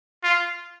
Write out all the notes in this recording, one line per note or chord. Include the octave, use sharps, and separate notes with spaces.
F4